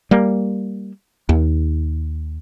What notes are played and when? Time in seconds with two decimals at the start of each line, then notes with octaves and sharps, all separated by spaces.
0.11 G3 A#3
1.29 D#2